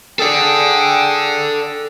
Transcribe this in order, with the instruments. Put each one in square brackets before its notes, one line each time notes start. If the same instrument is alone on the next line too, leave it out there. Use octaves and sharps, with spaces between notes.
[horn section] G#4 G5 [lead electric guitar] A4 D5